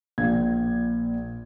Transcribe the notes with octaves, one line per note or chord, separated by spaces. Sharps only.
A#1 A#2 F5 G#6